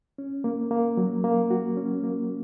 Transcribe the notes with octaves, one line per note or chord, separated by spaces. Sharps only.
C#4
A#3
A#3
F#3
A#3
F#4
C#4
A#3